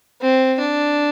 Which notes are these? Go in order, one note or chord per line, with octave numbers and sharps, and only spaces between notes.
C4
D4